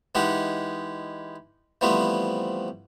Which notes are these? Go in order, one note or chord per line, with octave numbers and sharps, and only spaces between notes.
E3 G#3 D#4 G4 F#5
E3 F3 G3 A3 B3 C4